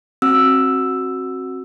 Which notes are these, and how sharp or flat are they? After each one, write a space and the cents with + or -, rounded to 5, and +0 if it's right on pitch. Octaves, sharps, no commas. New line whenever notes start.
C4 +25 F#4 +0 E6 +0